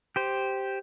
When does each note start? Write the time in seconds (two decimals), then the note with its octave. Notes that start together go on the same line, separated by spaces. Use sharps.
0.16 G4 C5